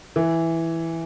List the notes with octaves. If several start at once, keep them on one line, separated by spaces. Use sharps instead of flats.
E3